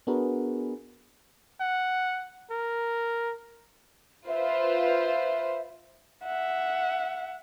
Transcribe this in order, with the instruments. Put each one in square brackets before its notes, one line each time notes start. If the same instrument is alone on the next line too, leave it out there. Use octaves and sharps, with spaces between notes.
[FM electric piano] B3 D4 F#4 G#4 A#4 B4
[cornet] F#5
A#4
[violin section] F4 B4 C5 [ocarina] E5
[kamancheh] E5 F#5